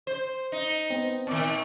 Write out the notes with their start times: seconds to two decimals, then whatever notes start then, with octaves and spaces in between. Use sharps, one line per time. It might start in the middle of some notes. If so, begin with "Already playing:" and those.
0.07 C5
0.52 D#4
0.90 B3 C4
1.27 A#2 D#3 A5 C#6 D6